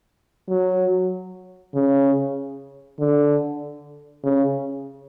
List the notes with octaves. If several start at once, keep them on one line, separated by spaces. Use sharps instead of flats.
F#3
C#3
D3
C#3